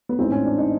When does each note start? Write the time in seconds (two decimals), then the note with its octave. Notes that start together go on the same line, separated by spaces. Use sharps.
0.09 B3
0.19 A1 G#2 E3 C4
0.32 C#4
0.45 D4
0.58 D#4